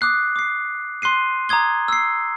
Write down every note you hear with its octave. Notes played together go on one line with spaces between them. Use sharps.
D6 D#6 F#6 C7
D6 C7
C6 F#6 C7 D#7
A#5 D6 D#6 G#6 G7
E6 C7